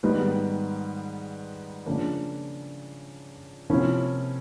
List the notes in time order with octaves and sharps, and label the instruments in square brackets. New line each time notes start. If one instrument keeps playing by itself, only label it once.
[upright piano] G#2 D#3 G3 B3 D#4
C#3 F3 A#3 D4
C3 F3 A#3 C#4 E4